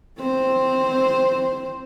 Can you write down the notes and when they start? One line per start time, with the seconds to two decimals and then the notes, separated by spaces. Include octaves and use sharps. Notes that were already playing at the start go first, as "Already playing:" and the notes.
0.19 C4 C5